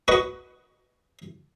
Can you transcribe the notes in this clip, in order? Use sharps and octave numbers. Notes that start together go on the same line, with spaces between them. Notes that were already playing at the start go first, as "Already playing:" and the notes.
F#4 B4 D#5 F#5